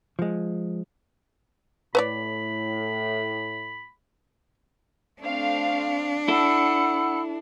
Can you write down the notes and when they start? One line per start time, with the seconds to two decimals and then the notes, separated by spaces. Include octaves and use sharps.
0.19 F3 G#3
1.95 A2 B4 C#5 D5 B5
5.21 A3 C4 D4 F5
6.28 E4 A4 F#5 B5 E6 C#7